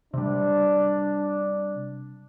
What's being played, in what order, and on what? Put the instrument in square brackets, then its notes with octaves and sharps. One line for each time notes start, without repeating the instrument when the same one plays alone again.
[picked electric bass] C3 G3 [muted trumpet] D4